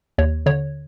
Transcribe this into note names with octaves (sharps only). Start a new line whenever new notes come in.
D#2 C#5
D3 C#5